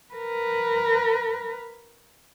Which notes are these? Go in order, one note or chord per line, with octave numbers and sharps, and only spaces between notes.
A#4 B4